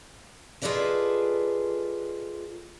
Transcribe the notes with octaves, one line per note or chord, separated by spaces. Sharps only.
F4 G#4 A4 B4 D5 D#5